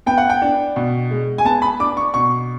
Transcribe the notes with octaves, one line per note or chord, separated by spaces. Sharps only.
B3 G5
F#5
G5
D4
B2
G#3
G#5
B3 A5
B5
D4 D6
C#6
B2 C#6